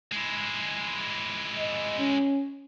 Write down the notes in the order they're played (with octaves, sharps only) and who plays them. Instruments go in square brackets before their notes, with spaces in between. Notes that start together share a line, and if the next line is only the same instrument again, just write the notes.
[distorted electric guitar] G#3 E4
[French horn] D#5
C#4